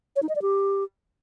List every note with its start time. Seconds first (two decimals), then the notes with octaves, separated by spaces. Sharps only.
0.16 C#5
0.22 D#4
0.29 D#5
0.35 D5
0.42 G4